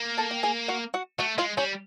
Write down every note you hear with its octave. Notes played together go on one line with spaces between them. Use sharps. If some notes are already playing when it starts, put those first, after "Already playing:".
Already playing: A#3
A4 A5
G5
G#4 G#5
F#4 F#5
F#4 F#5
A3 F#4 F#5
G#3 F4 F5
G3 C#4 C#5